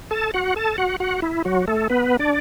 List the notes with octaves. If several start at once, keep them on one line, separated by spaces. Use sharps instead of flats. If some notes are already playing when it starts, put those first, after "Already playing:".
A4 A5
F#4 F#5
A4 A5
F#4 F#5
F#4 F#5
E4
F#3 F#4
A3 A4
B3 B4
D4 D5